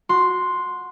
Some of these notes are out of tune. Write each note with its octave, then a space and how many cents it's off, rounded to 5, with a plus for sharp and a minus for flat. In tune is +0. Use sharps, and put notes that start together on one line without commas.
F#4 -20 C6 +0